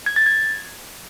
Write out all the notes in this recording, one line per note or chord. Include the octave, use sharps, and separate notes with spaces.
G#6
A6
G#6